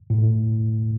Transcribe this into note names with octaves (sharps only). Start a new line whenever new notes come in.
A2